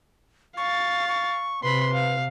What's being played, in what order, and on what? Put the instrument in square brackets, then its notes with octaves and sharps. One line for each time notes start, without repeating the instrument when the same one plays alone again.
[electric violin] F5 A6 [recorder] C#6
[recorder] C#6
[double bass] C3 [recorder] B4 [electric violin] B5 C6
[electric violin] F5